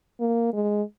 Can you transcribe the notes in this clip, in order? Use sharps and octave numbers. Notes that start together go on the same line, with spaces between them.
A#3
G#3